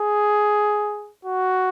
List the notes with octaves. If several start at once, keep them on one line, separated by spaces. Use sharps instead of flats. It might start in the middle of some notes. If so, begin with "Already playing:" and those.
Already playing: G#4
F#4